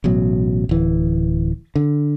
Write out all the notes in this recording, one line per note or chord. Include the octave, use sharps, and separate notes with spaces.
A1 B2 F#3
D1 E3
D3